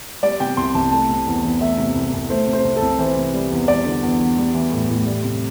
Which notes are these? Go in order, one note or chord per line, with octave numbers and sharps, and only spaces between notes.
G3 D5
C3 G5
C2 C6
C2 A5
A3 A5
C3
E2
E2
A3 E5
C3
C2
C2
A3 C5
C3
C5
C2
A4
C2
E3 C5
C3
G3
E2
G3 D5
D3
E2
E2
G3
E3
A2
A2
G3
C3